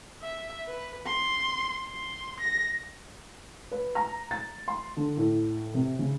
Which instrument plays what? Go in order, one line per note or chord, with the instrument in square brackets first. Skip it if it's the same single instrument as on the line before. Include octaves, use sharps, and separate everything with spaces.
[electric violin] E5
B4
C6
C6
A#6
[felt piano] B4
A#5
A6
C6
D3
A2
C3
C#3